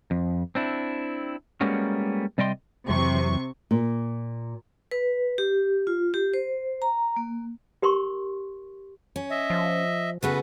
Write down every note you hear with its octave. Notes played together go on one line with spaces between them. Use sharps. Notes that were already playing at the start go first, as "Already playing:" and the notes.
F2
C4 D4 E4
G3 G#3 A#3 B3 C#4 F#4
C3 G3 D5 D#5 G5 C6
F2 C3 E3 F#3 C#6
A#2
B4
G4
F4
G4
C5
A#5
A#3
G4 A#4 C6 C#6
C#4
D#5 E5
F3
C#3 A3 B3 F#4 B4